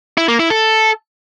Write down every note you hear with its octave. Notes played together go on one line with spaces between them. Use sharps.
E4
A#3
E4
A4